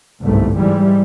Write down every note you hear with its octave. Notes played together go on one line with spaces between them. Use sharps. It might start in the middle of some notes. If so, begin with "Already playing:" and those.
G1 C2 G#2 A3
G#2 E3 G3 G#3